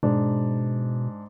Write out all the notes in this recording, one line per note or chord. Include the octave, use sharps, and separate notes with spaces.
G#2 B2 D4